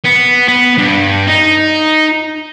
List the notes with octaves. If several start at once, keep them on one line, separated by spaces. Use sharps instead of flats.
B3
B3
G2
D#4